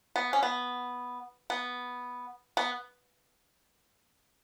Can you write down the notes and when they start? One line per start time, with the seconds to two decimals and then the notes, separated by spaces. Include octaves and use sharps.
0.16 B3
0.33 C#4
0.43 B3
1.50 B3
2.57 B3